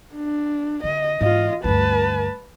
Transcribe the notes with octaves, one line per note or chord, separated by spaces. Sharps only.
D4
D3 D#5
G#2 E3 F4 D#5
D2 G2 B4 A5